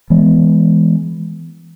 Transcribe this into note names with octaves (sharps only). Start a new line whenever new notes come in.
E3 G#3 B3